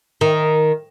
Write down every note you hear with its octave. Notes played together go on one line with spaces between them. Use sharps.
D#3